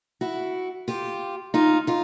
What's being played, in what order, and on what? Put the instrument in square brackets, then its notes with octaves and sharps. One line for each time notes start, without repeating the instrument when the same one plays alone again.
[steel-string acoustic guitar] E4 F#4
F4 G4
D#4 F4
D#4 F4